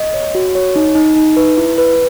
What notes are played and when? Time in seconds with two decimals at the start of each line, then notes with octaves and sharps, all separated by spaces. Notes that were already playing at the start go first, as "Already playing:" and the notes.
Already playing: D#5
0.14 C#5
0.35 F#4
0.55 C#5
0.76 D#4
0.95 D#4
1.16 D#4
1.37 B4
1.58 E4
1.78 B4